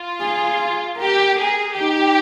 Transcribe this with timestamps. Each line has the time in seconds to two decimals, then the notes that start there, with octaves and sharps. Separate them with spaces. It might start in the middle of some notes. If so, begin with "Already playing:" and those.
Already playing: F4
0.21 G#4
0.98 G4 A#4
1.38 G#4
1.75 D#4 G4